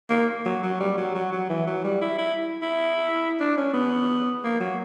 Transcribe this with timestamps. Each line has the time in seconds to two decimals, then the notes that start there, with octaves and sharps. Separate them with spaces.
0.10 A#3
0.45 F#3
0.63 F#3
0.80 G3
0.97 F#3
1.14 F#3
1.32 F#3
1.49 E3
1.67 F#3
1.84 G3
2.01 E4
2.18 E4
2.62 E4
3.40 D4
3.57 C#4
3.74 B3
4.44 A#3
4.60 F#3